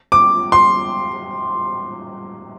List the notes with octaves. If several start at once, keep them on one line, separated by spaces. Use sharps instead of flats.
D6
C6